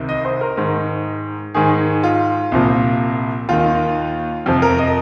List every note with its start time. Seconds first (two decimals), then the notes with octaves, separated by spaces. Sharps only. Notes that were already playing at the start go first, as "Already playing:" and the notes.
Already playing: C2 C3 D#3
0.09 D#5
0.25 C5
0.41 A#4
0.57 G#2 D#3
1.54 G#2 D#3 G#4
2.03 F4
2.52 C2 A#2 F3
3.49 D#2 D#3 F4
4.46 F2 C3 F3
4.62 A#4
4.78 D#5